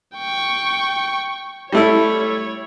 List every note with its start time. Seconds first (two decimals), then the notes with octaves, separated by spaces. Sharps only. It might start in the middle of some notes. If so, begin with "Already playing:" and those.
0.17 G5 C#6
1.72 G3 A3 E4 C#5